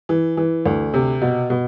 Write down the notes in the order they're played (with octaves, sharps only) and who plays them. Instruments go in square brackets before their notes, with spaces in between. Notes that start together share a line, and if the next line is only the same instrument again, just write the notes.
[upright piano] E3
E3
D2
C3
B2
B2